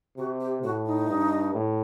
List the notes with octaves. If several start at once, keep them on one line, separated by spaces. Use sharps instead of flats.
C3 F#4
G4
A2 F#4
D#4
G2
A2